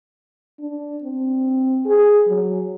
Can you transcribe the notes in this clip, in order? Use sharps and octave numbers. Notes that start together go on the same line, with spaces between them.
D4
C4
G#4
F#3